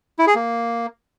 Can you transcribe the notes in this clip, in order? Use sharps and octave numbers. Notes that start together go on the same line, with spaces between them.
E4
G#4
A#3